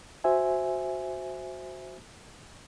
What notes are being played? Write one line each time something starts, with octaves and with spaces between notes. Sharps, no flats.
F#4 C5 E5 G#5